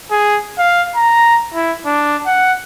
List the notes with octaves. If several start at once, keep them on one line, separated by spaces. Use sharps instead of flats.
G#4
F5
A#5
E4
D4
F#5